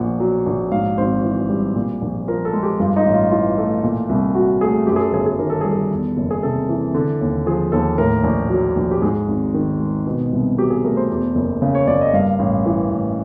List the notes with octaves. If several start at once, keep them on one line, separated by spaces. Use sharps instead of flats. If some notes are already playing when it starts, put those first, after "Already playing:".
Already playing: A#1 A#2 F#5
F#3
A#1
G#2 F5
G#1 C5
E3
G3
A#2
A#1
F3 A#4
A4
G#3
G4
G2 F4
D#4
A1
F4
E3 F4
A3
A#2
C2
F#3 F#4
A3 G#4
F#2 G4
G#4
A4
G1 G#4
G#4
D#3 A#4
A4
G3 G#4
A4
E2
F#1
G#4
C3 A4
E3
D3
D#2
F3 G#4
D#2 A4
A2 A#4
A#1
F#3
A#1
G4
G#2 G#4
G#1
D#3
G#3
B2
C2
F#3 G4
G#4
A3 A#4
C5
E2
F#1
C#3
C#5
F#1 D5
D#5
G2 F5
A1
E3
A1